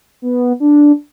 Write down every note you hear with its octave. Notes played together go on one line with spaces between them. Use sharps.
B3
D4